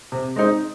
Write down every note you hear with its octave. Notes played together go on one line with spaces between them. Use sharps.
C3
G#3 C4 D#4